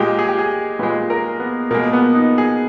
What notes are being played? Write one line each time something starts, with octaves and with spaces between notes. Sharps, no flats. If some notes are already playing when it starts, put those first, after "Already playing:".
Already playing: A#2 G#3 G4
G#4
G4
G#4
A#2 G#3 B4
A#4
B3
B2 G#3 A#3
A#3
B3
D#4
G#4